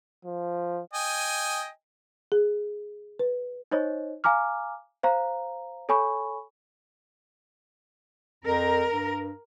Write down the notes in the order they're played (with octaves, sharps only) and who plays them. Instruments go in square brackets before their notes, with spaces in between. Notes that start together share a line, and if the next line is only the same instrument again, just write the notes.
[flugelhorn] F3
[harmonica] D#5 G5 G#5
[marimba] G#4
B4
[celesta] D#4 C5 C#5 D#5
F5 G#5 A#5 D6 F6
C5 F5 A#5
A4 C#5 G#5 B5 C#6
[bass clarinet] F2 [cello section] A#4
[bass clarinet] G2